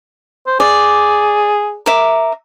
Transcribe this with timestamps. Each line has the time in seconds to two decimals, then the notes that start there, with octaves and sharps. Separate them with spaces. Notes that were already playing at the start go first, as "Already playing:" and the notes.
0.47 C5
0.60 G#4 D5
1.86 A#4 E5 D6